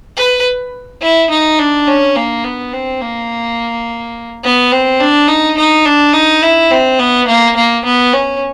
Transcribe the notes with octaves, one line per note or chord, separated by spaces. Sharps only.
B4
E4
D#4
D4
C#4
A#3
B3
C4
A#3
B3
C4
D4
D#4
D#4
D4
D#4
E4
C4
B3
A#3
A#3
B3
C#4